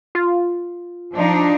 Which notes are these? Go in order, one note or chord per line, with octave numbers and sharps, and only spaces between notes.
F4
F3 D4 D#4